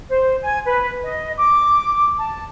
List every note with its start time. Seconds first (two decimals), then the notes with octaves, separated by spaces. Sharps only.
0.10 C5
0.43 G#5
0.66 B4
1.03 D#5
1.37 D6
2.18 A5